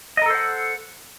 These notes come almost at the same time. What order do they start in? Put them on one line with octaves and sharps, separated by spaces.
D#5 A#4 A4 C5 F#5